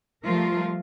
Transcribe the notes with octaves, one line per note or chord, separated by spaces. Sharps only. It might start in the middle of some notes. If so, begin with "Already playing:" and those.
F3 G3 A3 F4 A#4